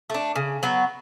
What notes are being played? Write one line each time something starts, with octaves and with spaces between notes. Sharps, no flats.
A3 D4
C#3
F#3 B3